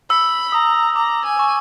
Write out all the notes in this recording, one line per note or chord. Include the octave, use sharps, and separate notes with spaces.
B5 E6
A#5 D#6
A#5 D6
G#5
C#6